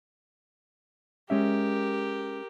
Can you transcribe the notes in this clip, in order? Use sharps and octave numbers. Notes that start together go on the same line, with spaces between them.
G#3 C#4 G4 A#4 E5